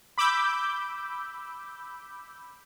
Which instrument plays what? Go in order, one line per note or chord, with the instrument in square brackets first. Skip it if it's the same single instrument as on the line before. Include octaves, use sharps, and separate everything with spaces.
[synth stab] B5 D6 E6 G6